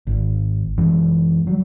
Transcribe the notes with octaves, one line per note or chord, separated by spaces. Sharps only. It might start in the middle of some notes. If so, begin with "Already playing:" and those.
G#1
F#2 E3 G#3
F#3 G3